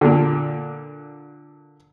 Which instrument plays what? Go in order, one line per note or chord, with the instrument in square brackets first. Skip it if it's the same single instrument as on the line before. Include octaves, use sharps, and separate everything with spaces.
[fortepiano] A#2 D3